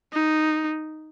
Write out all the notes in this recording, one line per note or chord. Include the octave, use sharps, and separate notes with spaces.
D#4